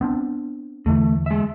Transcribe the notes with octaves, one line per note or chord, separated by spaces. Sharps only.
B3 C4 D4
E2 D3 E3 A3
G#3 E5